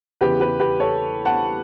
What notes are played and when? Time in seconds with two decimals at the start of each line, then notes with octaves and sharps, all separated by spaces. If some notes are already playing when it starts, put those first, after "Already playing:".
0.21 E2 C#3 E3 G4 B4
0.40 G4 B4
0.60 G4 B4
0.80 A4 C#5
1.25 F#5 A5